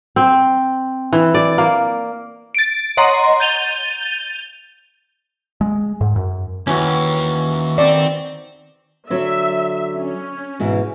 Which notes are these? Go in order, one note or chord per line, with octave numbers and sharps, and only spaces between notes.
C4
E3
D5
A#3
A6 D7
C#5 D#5 F#5 A#5 C6
G6 A6 D#7 F7 G7
G#3
G#2
F#2
D#2 E3 F#3 C#4 F#4
D#3 C4 D5
D3 F#3 C#5 E5
C#4
G#2 B2 E3